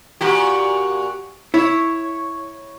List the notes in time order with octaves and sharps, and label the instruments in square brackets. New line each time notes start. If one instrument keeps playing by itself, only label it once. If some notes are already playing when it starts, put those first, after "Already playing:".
[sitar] A#2 F#4 G4
[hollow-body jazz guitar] E4 [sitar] C#5